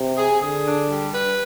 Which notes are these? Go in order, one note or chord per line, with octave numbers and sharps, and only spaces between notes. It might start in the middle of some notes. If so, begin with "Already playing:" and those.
Already playing: C3
G#4
D3 G#4
D4
G3
B4